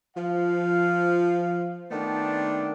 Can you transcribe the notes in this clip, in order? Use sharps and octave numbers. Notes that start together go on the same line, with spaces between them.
F3 F5
D#3 A3 B3 C4 D4